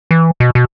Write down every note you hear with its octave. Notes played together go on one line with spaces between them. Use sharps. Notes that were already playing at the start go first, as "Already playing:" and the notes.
E3
B2
B2